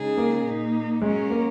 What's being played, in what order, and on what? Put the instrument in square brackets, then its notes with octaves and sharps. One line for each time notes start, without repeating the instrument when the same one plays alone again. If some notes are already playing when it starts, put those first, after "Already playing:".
Already playing: [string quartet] C#3 G#3 D#4 G#4
[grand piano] A#3
[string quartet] A#2 A#3 D#4
[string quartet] F#3 C#4 A#4 [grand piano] G#3
[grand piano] A#3